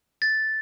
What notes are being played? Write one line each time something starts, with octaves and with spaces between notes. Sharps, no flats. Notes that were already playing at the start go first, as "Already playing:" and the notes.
A6